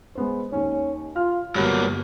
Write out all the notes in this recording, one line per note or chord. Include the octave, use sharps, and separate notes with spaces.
G#3 B3 C5
D#2 D#3 C#4
F4 F6
G1 G2 F#3 G3 A#3